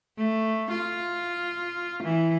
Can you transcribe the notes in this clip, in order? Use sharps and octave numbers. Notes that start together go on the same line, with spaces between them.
A3
F4
E3